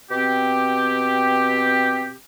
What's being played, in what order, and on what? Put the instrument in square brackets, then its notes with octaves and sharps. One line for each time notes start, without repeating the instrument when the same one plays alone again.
[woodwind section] B2 C4 G4